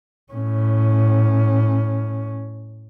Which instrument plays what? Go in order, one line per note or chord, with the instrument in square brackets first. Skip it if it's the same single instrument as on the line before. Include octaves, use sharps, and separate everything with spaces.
[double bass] A2 C#4